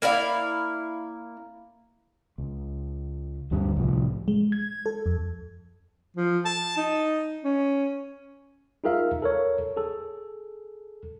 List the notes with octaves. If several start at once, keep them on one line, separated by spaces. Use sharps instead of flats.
A#3 E4 D5 F5
C#2
D2 G2 D3 G3
C2 A2 F3
G#3
G#6
A4
F2
F3
A5
D#4
C#4
D#4 F4 G#4 A#4 E5 F5
A4 A#4 C#5
G#4 A4